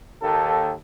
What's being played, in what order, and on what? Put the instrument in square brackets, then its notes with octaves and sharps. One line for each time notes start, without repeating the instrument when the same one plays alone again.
[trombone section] D#2 A4